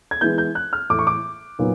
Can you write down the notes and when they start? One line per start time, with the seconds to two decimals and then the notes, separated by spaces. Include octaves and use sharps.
0.11 G#6
0.21 E3 G#3 B3 E4 G6
0.38 G6
0.55 F#6
0.73 F6
0.90 A2 E3 A3 D6
0.99 C#6
1.07 D6
1.59 A#2 F#3 B3 D#4